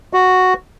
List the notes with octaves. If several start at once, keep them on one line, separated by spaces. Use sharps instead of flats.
F#4